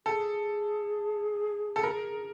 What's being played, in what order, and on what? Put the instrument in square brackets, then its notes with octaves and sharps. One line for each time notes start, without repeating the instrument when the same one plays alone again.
[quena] G#4 [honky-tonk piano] A4
[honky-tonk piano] A4
A#4